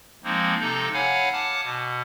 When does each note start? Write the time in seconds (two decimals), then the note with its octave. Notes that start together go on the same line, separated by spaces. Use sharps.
0.24 F3 G#3 A#3 C4 D#4
0.60 C3 D#4 A4 A#5
0.94 C#5 F5 F#5 G#5 B5
1.33 F#5 A5 D6 F6
1.63 B2